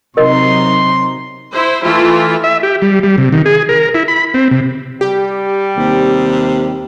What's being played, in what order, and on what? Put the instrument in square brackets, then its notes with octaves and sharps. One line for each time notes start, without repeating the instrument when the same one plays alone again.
[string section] C3 F#3 D#4 [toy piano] A#4 D#5 [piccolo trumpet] C6
[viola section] E4 C5
E3 A3 E4 F4
[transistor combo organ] E5
G4
G3
G3
C3
D#3
G#4
A#4
E4
B5
C4
C3
[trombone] G3 [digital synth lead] G4
[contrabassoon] D#2 [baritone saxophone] C3